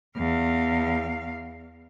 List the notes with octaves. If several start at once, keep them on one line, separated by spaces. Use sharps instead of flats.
E2 F5